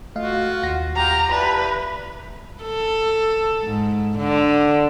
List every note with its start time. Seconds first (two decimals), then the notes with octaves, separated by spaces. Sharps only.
0.16 A3 F4 F#4 D#5 F5
0.63 D#2 F#5 A#6
0.96 F4 G4 A#5
1.32 E4 G4 B4 D5 A5
2.63 A4
3.64 G#2
4.18 D3